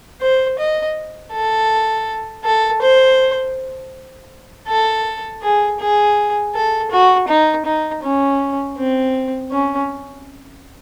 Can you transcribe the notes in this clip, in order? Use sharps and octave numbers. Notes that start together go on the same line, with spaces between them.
C5
D#5
A4
A4
C5
A4
G#4
G#4
A4
F#4
D#4
D#4
C#4
C4
C#4